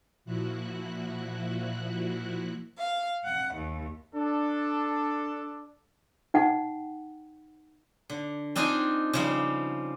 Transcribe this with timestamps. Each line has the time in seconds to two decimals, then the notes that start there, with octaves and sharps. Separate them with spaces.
0.25 A#2 F3 E4 F#4 F#6
2.79 F5
3.25 F#5
3.56 D#2
4.14 D4 A4
6.34 D#4 F#5 G5
8.10 D3
8.56 C4 D4 D#4 F4 G5 G#5
9.13 C#3 F3 G3